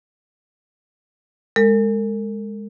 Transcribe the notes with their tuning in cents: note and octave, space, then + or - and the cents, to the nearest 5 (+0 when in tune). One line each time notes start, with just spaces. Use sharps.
G#3 -5 A#4 -45